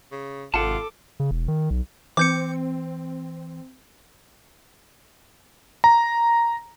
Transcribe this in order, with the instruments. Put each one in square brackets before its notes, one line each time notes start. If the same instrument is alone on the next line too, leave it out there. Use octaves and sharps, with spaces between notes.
[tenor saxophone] C#3
[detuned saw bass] G#1 [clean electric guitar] C3 F#5 A5 [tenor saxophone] F4 [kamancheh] A4 D6
[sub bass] C#3
E1
D#3
B1
[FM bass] E3 [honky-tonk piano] C4 [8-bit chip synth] D6 G6 C#7
[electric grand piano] A#5